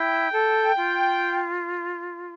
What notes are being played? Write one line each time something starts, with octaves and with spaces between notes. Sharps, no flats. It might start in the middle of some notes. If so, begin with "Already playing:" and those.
Already playing: E4 G5
A4
F4